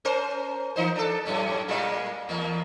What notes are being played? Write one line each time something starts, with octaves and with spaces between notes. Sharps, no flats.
C#4 A#4 C5
E3 D#4 C5
D4 A4
F#2 A2 C#4
A#2 G3 G#3
E2 A#3